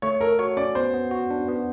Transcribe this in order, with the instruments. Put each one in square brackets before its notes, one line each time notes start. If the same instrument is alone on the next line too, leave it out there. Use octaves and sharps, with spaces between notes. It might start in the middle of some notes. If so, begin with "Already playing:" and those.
[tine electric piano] A3 [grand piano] C#5
[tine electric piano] A4 [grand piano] A#4
[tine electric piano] F#4 [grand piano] C#5
[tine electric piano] C#4 [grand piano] D5
[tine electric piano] B3 [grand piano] C5
[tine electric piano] B3
F#4
D4
B3